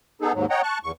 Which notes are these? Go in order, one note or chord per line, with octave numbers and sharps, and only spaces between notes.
B3 D#4 G#4 A4
D#2 G#2 F#3
C#5 D#5 F#5 G5 A#5
A5 C#6 F#6
E2 C#6